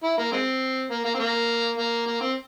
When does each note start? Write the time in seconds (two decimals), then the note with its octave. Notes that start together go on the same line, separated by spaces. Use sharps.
0.03 E4
0.18 A#3
0.32 G#3 C4
0.90 A#3
1.05 A#3
1.14 C4
1.19 A#3
1.78 A#3
2.06 A#3
2.21 C4